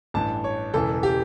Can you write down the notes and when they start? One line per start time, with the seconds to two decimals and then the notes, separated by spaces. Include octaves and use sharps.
0.14 A1 G2 E3 A5
0.44 C#5
0.74 E1 E2 C#3 E3 A4
1.03 G4